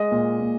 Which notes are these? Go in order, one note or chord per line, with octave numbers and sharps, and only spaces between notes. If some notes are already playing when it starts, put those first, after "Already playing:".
Already playing: G#3 D#5
A#2
A#2